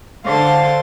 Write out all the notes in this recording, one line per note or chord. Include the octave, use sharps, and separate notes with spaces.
D3 C5 F5 A5 C6